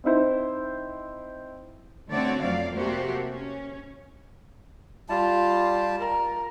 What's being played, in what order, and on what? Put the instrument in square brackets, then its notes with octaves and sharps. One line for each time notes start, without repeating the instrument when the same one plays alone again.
[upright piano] C4 D#4 E4 C5
[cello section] D3 A3 C4 F#4 C#5 D5
F2 F#3 A3 D5 F5
C3 A3 A#3 F#4 G4 C5
C#4
[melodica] G3 A5 [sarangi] F4
[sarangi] A#4